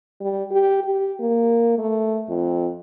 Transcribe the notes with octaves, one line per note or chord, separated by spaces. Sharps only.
G3
G4
G4
A#3
A3
F2